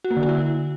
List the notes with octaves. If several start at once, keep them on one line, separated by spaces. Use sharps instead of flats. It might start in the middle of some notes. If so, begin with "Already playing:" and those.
F#4
A#3
D3
F#4
E4